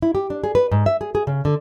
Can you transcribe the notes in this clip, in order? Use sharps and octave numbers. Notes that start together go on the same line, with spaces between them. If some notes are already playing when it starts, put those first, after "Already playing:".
E4
G4
D4
G#4
B4
G#2
E5
G#4
G#4
C#3
D3